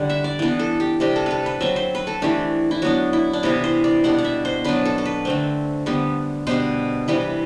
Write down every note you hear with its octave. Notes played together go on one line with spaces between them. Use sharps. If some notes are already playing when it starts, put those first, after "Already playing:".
Already playing: D3 G3 D4 F#5
E5
D5
E3 B3 D4
A4
G4
C3 G3 D4 G4
A4
A4 B4
B4
F#3 C4 E5
C5
B4
A4
E3 A3 D4 G4
E4
F#3 B3 D4 F#4
E4
D4
C3 E3 B3 E4
C5
D5
B2 G3 D4 F#5
F#5
E5
C5
F#3 B3 D4 B4
A4
A4
B4
D3 A3 C4
D3 G3 B3
B2 G3 D4 C5
C3 E3 G3 B4